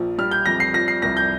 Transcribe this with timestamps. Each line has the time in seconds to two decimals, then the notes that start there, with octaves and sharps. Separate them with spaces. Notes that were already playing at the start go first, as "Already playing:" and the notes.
Already playing: A#1 F3
0.18 G3 F6
0.31 G6
0.46 F2 A#6
0.60 C7
0.74 F3 A#6
0.88 C7
1.02 C2 A#6
1.17 G6